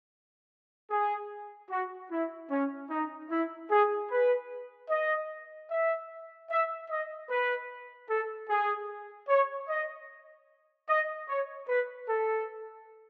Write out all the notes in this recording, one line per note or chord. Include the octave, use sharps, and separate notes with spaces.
G#4
F#4
E4
C#4
D#4
E4
G#4
B4
D#5
E5
E5
D#5
B4
A4
G#4
C#5
D#5
D#5
C#5
B4
A4